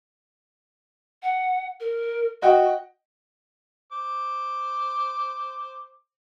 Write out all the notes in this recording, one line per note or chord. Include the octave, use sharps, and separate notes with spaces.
F#5
A#4
F#4 D#5 F#5 G5
C5 D6